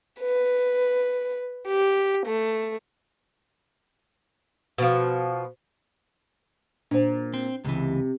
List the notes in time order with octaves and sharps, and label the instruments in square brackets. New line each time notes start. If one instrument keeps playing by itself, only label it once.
[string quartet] B4
G4
A3
[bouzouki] B2 F3
[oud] A#2 [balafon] D4 C5
[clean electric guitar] C4
[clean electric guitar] C#2 E3 [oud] C3